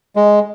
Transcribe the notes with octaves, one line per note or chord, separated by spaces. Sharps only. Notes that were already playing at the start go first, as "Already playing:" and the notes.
G#3